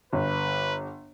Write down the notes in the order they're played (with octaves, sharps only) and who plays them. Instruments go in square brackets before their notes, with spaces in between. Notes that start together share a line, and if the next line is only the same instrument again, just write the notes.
[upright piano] G1 [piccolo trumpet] B4